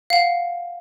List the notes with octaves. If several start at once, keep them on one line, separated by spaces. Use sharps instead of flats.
F5 F#5